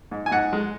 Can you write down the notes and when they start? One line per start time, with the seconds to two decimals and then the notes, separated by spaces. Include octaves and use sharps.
0.11 G#2
0.26 G#5
0.31 G#2 F#5
0.53 G#3